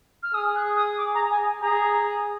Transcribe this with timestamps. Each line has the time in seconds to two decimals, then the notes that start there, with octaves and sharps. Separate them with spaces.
0.23 F6
0.34 G#4 D#6
0.55 F#6
0.76 D#6
0.97 D6
1.14 A#5
1.30 G#5
1.46 G#5
1.61 G#4 A#5